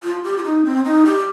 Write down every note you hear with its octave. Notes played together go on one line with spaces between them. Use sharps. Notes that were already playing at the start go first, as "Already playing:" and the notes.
F4
G4
F4
D#4
C4
D#4
G4